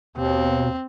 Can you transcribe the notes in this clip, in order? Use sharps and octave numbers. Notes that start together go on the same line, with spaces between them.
D#2 B2 C4